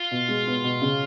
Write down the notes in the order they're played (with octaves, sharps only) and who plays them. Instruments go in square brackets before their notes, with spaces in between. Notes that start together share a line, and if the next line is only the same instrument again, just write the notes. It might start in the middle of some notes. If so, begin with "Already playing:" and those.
Already playing: [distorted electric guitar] F4
[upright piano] B2
G#3
B3
B2
C#3